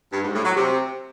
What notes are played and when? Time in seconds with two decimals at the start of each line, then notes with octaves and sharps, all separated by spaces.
0.12 G2
0.23 G#2
0.34 A2
0.45 F#3
0.55 C3